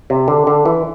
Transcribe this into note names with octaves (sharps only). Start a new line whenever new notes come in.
C3
D3
D3
E3